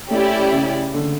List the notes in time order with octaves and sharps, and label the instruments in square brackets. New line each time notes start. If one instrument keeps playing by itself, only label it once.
[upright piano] A3 [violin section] C#4 E4 G4 D5
[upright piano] C#3
D3